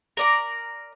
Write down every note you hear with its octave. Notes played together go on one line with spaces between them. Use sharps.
A#4 D5 A#5